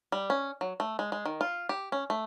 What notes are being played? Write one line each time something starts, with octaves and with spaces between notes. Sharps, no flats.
G3
C#4
F#3
A3
G#3
G#3
D#3
F4
G4
C#4
A3